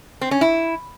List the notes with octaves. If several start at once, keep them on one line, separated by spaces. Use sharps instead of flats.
C4
C#4
E4